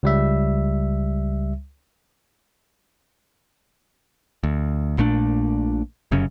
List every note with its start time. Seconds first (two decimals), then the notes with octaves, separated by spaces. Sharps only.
0.03 C#2 G3 E5
4.43 D2
4.98 A#1 A#2 A3 D4
6.11 F1 F#2 C#3 C#4